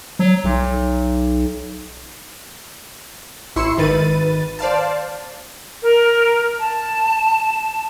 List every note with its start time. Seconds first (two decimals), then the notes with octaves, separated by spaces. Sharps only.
0.19 F#3
0.44 B1
3.56 A1 E4 C6 C#6 E6 C#7
3.77 G#1 D#3 B4 A6 D#7
4.59 C5 D5 F5 A5
5.83 A#4
6.59 A5